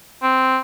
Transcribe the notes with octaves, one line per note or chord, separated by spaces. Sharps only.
C4